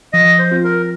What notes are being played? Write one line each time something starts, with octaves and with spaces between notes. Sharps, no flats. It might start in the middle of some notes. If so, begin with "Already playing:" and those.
F3 D#5
C5
C4 F4
A#4